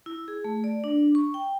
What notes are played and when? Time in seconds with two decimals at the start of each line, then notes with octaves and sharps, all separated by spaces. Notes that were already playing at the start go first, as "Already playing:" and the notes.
0.06 E4
0.28 G#4
0.44 A3
0.64 D5
0.84 D4
1.15 C#6
1.34 G5